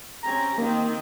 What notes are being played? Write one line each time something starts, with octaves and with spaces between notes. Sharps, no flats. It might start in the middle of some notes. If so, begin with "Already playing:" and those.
C4 C#4 G4 A#5
D#3 A#3 C4